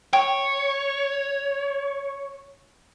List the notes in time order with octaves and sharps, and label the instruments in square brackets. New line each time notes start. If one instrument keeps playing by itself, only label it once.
[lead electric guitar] C#5 [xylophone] G5